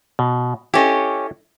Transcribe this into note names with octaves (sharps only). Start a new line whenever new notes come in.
B2
C#4 E4 G4 A4 D#5